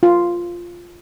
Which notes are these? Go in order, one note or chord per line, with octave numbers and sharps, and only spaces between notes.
F4